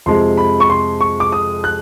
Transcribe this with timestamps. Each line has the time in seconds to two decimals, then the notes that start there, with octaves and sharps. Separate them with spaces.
0.06 F2 C3 F3 G#3 C6
0.37 B5
0.60 C#6
0.70 C6
1.01 C#6
1.20 D6
1.32 D#6
1.64 F#6